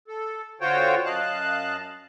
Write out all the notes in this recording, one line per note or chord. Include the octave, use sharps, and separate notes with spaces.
A4
D3 F4 F#4 C5 C#5 G5
F#2 D#5 F5 A5 F#6